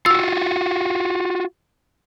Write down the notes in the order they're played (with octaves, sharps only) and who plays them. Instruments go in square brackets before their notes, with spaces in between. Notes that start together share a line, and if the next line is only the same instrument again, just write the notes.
[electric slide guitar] F4 F#4 [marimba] E6